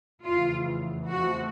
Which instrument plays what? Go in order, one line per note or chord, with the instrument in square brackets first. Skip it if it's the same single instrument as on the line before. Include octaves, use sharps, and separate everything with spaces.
[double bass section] F1 E2 C#3 E3 [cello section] F4
[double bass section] E2 C#3 F3 A3 C4 [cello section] F#4